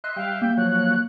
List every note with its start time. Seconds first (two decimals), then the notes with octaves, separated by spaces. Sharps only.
0.04 D#5 E5 C6 F#6
0.16 G3 E5 F5 G5
0.42 A#3 G6
0.57 F3 F#3 C#5 F#6